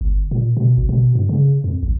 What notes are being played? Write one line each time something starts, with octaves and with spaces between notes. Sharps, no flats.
G1
A#2
B2
G#1
B2
G2
C#3
F2
A1